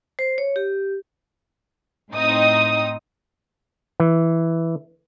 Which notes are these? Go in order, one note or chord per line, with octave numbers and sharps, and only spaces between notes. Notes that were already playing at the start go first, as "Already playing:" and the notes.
C5
C#5
G4
A2 C4 D#4 D#6
E3